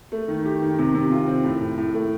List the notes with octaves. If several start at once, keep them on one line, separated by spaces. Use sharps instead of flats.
A3
D#3
G4
D#3
C3
C3
F4
C4
A2
A2
A2
A3